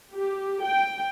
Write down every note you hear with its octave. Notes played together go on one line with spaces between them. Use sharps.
G4
G5